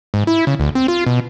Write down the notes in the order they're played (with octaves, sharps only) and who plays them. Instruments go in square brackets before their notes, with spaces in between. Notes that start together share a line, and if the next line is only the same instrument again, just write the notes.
[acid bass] G#2
E4
C#3
D2
C4
F4
B2